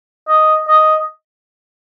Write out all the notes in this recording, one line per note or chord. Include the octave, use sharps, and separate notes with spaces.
D#5
D#5